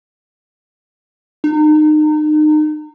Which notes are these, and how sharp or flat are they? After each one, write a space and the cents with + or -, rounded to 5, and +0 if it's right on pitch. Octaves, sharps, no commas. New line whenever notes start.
D#4 -30